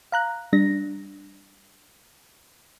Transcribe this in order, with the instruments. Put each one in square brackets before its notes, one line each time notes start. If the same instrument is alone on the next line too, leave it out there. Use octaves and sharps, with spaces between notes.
[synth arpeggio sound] F5 A#5 F#6
G3 D4 A#6